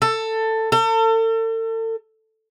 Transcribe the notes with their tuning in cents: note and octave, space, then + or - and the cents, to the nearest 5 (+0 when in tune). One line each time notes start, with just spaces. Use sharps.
A4 +15
A4 +40